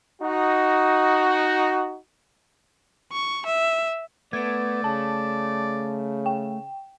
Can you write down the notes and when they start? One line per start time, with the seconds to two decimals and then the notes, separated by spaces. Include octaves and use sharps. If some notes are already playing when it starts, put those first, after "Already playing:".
0.21 D#4 F#4
3.13 C#6
3.46 E5
4.33 A3 B3 D5 G#6 D7
4.84 C#3 A5
6.26 G5